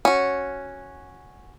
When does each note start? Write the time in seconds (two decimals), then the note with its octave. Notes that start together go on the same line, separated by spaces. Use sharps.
0.05 C#4 F#4